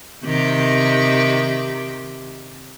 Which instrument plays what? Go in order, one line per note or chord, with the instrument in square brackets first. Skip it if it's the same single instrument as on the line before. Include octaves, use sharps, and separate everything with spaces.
[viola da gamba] C3 D#3 G4